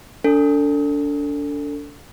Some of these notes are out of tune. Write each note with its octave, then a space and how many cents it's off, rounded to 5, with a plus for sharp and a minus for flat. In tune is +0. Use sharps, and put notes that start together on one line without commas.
D4 -30 A4 +25